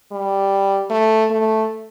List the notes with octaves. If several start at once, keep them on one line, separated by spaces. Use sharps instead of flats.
G3
A3
A3